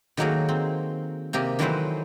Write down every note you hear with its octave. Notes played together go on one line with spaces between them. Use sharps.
D#3 F#3 A3 A#3 F#4 G#4
C4
C3 A#3 G4 D#5
D#3 E3 F#3 A3 B4 C5